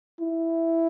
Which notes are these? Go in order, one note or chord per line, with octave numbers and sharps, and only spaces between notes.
E4